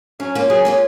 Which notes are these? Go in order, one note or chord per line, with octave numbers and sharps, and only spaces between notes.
F#3 C#4
A#3 C#4 F4
F#3 G#4
A#3 C#4 F4